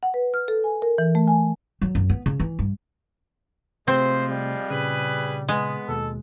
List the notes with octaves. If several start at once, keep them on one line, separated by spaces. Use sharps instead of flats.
F#5
B4
F6
A4
G#5
A#4
E3
A3
G#5
F#3
F#2
B3
C#3
E3
G2
C3 F3 G#3 A3 C4 C5
G3
A#2 C#3 G#4 B4
G#3 B3
D#2 B2 A4